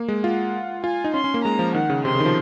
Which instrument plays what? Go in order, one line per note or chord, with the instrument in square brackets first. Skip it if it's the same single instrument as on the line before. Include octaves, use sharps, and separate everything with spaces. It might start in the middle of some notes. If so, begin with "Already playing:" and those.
Already playing: [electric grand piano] A#3
G#3
[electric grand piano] F4 [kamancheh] F#5
[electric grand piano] F4 [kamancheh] G#5
[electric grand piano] D#4
[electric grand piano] C#4 [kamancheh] C6
[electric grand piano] C#4
A#3
[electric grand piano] G#3 [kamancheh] A#5
[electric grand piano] F3
[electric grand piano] D#3 [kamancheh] F#5
[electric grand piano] C#3
[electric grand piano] C3 [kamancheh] C6
[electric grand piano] C#3
D#3
F3